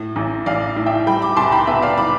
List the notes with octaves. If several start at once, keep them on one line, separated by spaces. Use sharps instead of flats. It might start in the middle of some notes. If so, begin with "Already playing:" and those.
Already playing: A2
A1
A1 D5 F5
A2
E5 G5
G3 G5 B5
B5 D6
C2 A5 C6
G5 B5
B3 E5
D5 F5
B5 D6